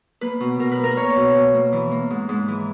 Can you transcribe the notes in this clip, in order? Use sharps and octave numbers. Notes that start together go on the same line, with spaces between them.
A#3 B4
B2
B2 A#4
B4
A#3
A#4
A#3 C#5
B2
B2
A#3
E3
A#3
G#2
G#2
E3